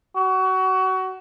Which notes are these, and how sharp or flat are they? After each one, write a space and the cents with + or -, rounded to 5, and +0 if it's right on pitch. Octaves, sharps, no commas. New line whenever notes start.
F#4 +25